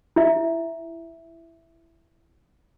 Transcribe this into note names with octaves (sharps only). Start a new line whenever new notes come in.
E4 E5